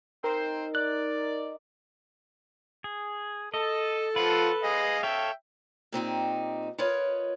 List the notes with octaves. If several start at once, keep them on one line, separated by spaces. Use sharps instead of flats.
C4 D#4 A#4 C5
D5 F#6
G#4
A4 D#5
F3 F4 B4 F#5
G#4 D#5 F5
A4 C#5 E5 F5 G5
A#2 C4 D#4 G4
F4 A#4 B4 C#5 D#5